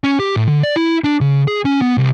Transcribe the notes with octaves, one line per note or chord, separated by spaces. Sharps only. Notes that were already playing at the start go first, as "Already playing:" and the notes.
C#4
G4
A2
D3
D5
E4
D4
C#3
G#4
C#4
B3
C2